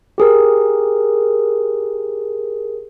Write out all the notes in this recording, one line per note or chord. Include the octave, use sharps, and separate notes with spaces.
G4 G#4 A#4